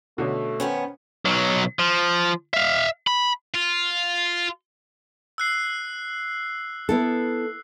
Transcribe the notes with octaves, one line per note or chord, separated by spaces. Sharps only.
B2 D3 A3 C#4
D#3 B3 C#4 C5
B1 F#3
F3
E5 F5
B5
F4
E6 F#6 C7
B3 E4 A4